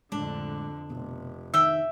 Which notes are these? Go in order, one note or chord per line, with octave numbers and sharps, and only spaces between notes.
F2 A2 D3 G#3 D4
F1 B2
D#3 E5 G5 E6